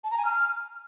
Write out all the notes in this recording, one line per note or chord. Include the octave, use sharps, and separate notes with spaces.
A5
A#5
G#5
F6